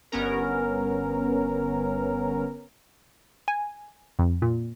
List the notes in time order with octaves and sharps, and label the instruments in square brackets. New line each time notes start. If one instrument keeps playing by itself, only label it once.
[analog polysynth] G1 B3 C#4 A#4
[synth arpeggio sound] G#5
F2
A#2